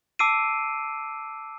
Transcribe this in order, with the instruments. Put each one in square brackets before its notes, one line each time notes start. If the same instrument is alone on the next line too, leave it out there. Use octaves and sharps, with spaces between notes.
[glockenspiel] A5 D6 E6 C7 D7 D#7